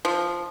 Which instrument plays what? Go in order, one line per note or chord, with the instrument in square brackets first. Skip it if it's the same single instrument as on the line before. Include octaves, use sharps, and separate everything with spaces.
[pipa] F3